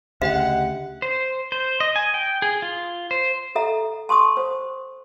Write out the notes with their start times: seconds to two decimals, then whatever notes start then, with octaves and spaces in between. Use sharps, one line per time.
0.22 D2 C#3 G4 D#5 E5 F#5 G5
1.02 C5
1.52 C5
1.80 D#5
1.96 G#5
2.14 G5
2.42 G#4
2.62 F4
3.11 C5
3.55 A4 E5 A#5
4.09 A5 C6 C#6 D#6
4.37 C5